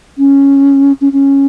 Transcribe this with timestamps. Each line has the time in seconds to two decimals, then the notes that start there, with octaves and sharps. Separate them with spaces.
0.18 C#4
1.01 C#4
1.13 C#4